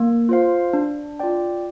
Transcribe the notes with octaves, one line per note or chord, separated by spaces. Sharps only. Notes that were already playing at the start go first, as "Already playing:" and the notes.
Already playing: A#3
F4 C5 F5
D4
F4 D5 G5